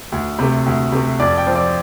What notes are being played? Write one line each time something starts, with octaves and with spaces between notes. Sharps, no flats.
D2
C3 A3
D2
C3 A3
F2 D5
G5
F3 C4
D5